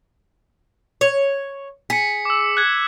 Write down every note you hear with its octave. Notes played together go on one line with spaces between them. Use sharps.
C#5
G#4 B6 C#7
D6 E6
F#6 G#6